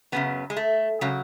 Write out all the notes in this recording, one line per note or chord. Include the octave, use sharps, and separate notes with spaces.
F#2 C#3 F#3 B3
G#3
A3
C#3 F#3 G#3